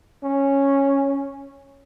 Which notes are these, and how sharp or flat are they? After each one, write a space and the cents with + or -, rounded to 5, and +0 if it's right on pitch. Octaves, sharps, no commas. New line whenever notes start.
C#4 -5